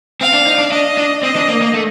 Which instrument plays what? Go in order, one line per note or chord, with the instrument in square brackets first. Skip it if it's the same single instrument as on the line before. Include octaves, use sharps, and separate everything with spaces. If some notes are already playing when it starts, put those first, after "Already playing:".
[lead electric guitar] C4 [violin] F5
[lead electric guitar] D4
D#4
D4
[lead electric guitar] D4 [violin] D#5
[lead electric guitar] D4
[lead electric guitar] C4 [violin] D#5
[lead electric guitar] D4
A#3
A#3
A3